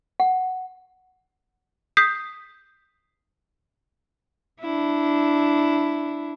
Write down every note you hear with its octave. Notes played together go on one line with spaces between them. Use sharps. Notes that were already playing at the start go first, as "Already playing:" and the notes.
F#5
D#6 G6 B6 C7
D4 E4